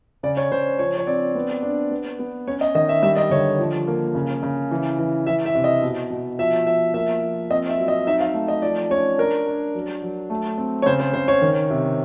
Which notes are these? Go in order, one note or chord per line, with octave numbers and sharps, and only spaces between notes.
C#3 D5
C#5
C#3 C5
F3 C#5
C#5
C4 D5
B3
D4
B3
B3
C#4 C#5
D#5
D#3 D#5
E5
G3 E5
D#5
D3 C#5
F3
A#3
C#3
C#3
E3
E3
E3 E5
E5
C3
D#5
B2
B2
F3 E5
F3 E5
A#3 E5
F3
C4 D#5
E5
F#3
D#5
D#4 E5
F5
A3
D#5
F3 D5
C#4 C#5
D4 A#4
D4
F#3
F#3
A3
C4
C#5
C#3 C5
C5
C#3 C5
C#5
D#3
C3